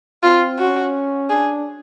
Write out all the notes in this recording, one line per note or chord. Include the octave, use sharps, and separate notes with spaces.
C4 F4
C#4 F#4
D4 G#4